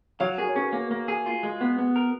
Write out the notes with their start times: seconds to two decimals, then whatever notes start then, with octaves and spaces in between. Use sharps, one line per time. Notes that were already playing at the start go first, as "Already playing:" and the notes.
0.20 F#3 C#5 F5
0.38 F#4 G#4 A#4
0.49 C#5
0.55 C#4 G#4 B4
0.73 A#3
0.91 A#3
1.08 G#4
1.26 F4
1.43 G#3
1.61 B3
1.78 B3
1.96 A#4